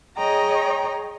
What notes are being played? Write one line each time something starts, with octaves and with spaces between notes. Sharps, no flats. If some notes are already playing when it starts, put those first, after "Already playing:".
G#4 C#5 D#5 G5 A#5